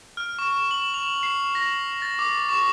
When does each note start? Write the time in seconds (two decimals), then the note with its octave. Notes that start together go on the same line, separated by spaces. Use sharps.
0.17 F6
0.39 C#6
0.71 F#7
0.94 F7
1.23 C7
1.55 A#6
2.02 A6
2.19 D6
2.49 C#6